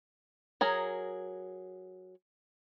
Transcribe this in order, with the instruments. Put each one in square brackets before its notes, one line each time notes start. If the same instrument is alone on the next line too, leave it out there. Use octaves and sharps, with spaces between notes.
[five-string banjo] F#3 G#4 A#4